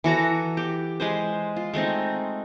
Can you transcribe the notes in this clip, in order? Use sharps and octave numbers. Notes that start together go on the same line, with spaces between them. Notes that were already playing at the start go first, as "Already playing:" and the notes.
E3 F#4 A4 A#5
G4
G#3 B4 C5
F4
G#3 A3 C4 D#4